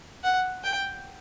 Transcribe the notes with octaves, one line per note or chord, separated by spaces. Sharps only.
F#5
G5